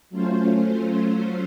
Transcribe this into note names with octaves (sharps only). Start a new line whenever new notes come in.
F#3 A3 C#4 F4 C5